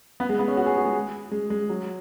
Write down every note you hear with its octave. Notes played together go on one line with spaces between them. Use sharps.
B3
G#3
B3
C#4
F#4
G#4
F#4
G#3
G#3
G#3
F#3